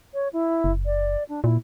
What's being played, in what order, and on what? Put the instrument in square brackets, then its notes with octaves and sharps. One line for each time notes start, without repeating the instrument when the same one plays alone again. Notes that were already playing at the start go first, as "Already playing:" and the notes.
[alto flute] C#5
E4
[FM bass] F#1
[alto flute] D5
D4
[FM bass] A#2 [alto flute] E4